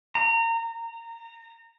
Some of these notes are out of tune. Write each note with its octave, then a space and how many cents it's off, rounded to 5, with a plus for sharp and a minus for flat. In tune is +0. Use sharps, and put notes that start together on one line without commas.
A#5 -25